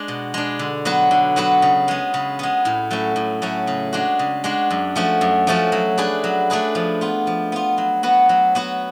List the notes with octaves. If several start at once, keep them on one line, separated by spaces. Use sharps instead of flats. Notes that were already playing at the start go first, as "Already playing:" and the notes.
Already playing: G#3 D4
B2
G#3 D4
D3
F#3 B3 F#4 B4
D3
F#3 B3 F#4 B4
C#3
G#3 B3
C#3
G#3 B3
A2
F#3 A3 C#4
A2
F#3 A3 C#4
C#3
G#3 D4 F#4
C#3
G#3 D4 F#4
F#2
F3 A3 C#4 F#4
F#2
F3 A3 C#4 F#4
F#3
A3 D4 G#4 B4
F#3
A3 D4 G#4 B4
F3
B3 F4
F3
B3 F4
F#3
B3 F#4 B4
F#3
B3 F#4 B4